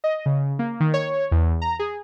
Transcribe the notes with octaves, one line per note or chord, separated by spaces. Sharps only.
D#5
C#3
A#3
D#3
C#5
E2
A#5
G#4